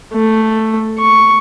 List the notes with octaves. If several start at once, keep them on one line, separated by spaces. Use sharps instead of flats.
A3
C#6